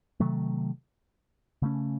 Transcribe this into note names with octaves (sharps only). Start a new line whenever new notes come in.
C3 D#3 F#3 A3
C#3 A3 C#4